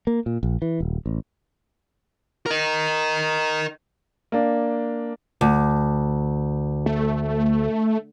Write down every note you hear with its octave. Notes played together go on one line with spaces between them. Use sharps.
A#3
A#2
A#1
E3
D#1
A1
A#4 D#5
A#3 D4
D2
A3